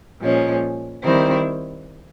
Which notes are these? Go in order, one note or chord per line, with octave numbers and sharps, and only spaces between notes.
A#2 F3 G#3 C#4
D#3 G3 C4 E4